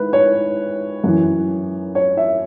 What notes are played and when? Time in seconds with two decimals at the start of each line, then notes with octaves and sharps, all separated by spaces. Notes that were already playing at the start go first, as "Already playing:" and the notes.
Already playing: G#2 D#3 E4 B4
0.13 C#5
1.04 F#2 E3
1.95 C#5
2.17 E5